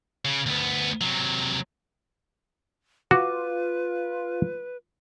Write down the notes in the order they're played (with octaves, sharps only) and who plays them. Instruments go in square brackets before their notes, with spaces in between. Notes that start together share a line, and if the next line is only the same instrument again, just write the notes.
[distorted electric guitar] C#3
D2 B3
C3 F#3
[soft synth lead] F4 [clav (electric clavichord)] F#4 [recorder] B4 [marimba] D6